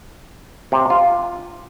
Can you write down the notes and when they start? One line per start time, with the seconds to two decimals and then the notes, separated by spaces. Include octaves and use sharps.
0.72 C3
0.90 F4